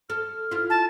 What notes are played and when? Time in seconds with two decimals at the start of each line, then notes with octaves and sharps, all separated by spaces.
0.10 A4 F6
0.51 E4 F4
0.70 A5